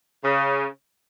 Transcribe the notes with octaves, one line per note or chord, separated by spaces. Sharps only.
C#3